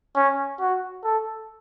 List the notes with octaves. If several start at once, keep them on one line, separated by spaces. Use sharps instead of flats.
C#4
F#4
A4